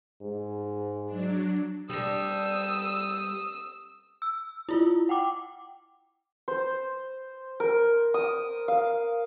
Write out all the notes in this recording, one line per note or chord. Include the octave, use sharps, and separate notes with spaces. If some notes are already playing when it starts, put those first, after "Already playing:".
G#2
F#3 D4
G3 D4 D#6 E6 E7
E6
E4 F4
F#5 G5 D6
C5
A#4
D#6
F5